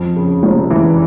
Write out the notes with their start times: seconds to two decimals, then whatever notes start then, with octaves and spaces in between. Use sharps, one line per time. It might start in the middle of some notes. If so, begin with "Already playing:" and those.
Already playing: F2
0.16 C#3
0.43 F1
0.70 E3